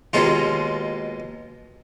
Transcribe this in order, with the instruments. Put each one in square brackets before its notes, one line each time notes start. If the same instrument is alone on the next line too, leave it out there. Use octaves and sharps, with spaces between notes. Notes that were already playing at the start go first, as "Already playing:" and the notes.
[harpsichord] D#2 B2 G#3 F4